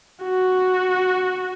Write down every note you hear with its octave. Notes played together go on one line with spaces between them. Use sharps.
F#4